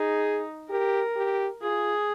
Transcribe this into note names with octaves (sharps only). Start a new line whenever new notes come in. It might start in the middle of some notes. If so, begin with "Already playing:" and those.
Already playing: D#4 G#4
G4 A#4
G4
F4 G#4